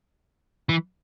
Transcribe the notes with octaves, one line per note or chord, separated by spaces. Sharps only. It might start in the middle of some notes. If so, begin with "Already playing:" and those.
E3